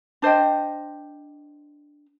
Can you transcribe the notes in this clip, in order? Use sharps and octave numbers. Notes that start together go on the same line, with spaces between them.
D4 C5 D#5 G5